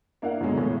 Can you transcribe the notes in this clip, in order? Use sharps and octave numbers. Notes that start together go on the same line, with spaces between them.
A#3 D4 E4 A#4 F5 F#5
G#2 B2 D3 F3 F#3 G#3
B1 A2 E3 G#3